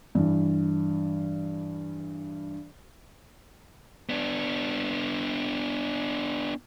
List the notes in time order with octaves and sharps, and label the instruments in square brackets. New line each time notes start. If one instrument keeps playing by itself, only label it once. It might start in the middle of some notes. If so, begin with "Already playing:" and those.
[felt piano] G2 E3
[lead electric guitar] B3 D4